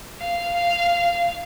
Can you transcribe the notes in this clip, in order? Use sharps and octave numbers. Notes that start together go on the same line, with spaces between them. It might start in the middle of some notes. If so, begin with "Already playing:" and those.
F5
F5